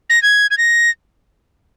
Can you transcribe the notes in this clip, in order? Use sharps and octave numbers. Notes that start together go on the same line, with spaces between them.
A#6
G#6
G#6
A#6